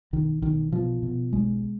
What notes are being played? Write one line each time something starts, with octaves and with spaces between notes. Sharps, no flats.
B1 D#3
B1 D#3
B2 F3
B2
B1 G#3